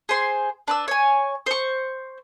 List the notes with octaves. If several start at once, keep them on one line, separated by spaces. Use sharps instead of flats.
G#4 C5 C6
D4 B4 E6
C#5 G#5
C5 C#6